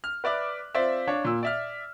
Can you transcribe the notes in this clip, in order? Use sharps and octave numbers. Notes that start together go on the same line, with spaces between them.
F6
B4 D5 E5 D6 F#6
C4 F4 C5 D5 E5
D4 C#5 F5
A#2 E6
D5 E5 F6